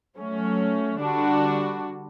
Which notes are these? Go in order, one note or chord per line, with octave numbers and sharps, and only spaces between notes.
F#3 A3 C#4
D3 G3 D4 F#4